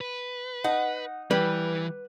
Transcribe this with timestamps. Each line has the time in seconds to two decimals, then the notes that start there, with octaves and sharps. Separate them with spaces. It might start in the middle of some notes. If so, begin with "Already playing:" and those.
0.01 B4
0.64 D#4 F#5
1.31 E3 G3 B4